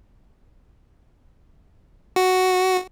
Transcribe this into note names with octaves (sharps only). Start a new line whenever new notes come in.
F#4